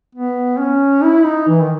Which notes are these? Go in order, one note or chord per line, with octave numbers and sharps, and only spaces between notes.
B3
C#4
E4
D#4
E3
D#3